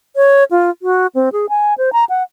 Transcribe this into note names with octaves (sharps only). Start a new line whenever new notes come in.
C#5
F4
F#4
C4
G#4
G#5
C5
A#5
F#5